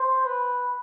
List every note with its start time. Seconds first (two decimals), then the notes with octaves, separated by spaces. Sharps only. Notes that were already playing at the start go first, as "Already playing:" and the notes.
Already playing: C5
0.26 B4